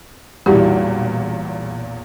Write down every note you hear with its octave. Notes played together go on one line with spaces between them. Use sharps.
B1 E2 A#2 G3 E4 F#4 G4